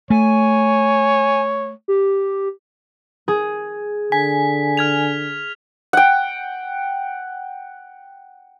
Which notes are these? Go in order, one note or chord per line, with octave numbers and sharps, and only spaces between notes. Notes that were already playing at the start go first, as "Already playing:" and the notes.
A3 C#5 G#5
G4
G#4
D3 G#5 B6
F6 G#6 F7
F#5 G5